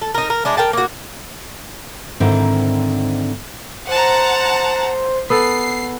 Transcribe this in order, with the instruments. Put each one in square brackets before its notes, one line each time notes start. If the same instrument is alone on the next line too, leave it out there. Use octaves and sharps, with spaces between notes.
[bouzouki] A4
D#4 A#4
A#4
G#3 D4 E4
A#4 G5 A5
A#3 F#4
[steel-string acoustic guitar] G#2 D3 D#3 C4 E4
[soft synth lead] C5 [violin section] F#5 A5 A#5
[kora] B3 A4 [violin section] C7